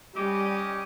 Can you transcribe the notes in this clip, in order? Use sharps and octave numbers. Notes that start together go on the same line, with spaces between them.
G3 C#4 G4 D#5